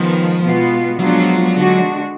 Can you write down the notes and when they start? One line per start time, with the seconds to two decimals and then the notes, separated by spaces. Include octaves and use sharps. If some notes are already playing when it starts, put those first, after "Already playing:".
Already playing: D#3 F3 G#3 B3
0.43 B2 G#3 B3 F4
0.99 F3 F#3 G#3 B3 D4 F4
1.55 D3 G#3 D4 F#4